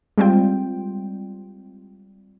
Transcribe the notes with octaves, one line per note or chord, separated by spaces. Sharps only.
G3 G#3 C4 F4 G5